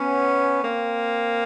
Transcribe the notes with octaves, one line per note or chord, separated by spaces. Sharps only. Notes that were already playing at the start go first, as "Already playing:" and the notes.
Already playing: B3 C#4
A#3 C4